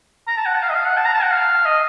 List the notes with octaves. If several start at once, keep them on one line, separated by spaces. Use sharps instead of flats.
A#5
A5
F#5
A5
F5
D#5
F5
F#5
A5
A#5
A5
F#5
F5
D#5